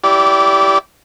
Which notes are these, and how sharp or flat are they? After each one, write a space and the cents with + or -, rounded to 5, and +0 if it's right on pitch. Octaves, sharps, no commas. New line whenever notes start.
E4 +0 G4 -5 D5 -25